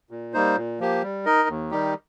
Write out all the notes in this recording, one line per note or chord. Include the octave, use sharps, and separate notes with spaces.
A#2
G3 A#3 D#4 C5
A#2
F3 A#3 G4
G3
D#4 A#4 D#5
D#2
D#3 G3 D#4 G4